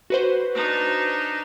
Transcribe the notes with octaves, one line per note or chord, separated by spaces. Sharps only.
F#4 B4 C5
D4 D#4